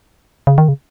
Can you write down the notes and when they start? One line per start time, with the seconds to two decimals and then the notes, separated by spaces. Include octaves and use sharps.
0.47 C#3
0.58 D#3
0.68 C#3